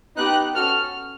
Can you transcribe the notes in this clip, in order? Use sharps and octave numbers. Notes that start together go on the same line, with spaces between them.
B3 D#4 G4 F#6
C#4 F#4 A4 F6